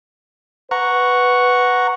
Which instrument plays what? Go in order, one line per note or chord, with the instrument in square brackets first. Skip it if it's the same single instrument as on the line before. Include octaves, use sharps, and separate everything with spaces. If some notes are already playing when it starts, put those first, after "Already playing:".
[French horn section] B4 [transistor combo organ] F#5 A#5 C#6